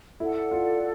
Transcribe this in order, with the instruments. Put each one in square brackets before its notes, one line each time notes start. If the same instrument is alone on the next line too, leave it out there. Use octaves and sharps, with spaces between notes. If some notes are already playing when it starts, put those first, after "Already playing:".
[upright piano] E4 [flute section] A4 D5 F#5
[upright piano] F4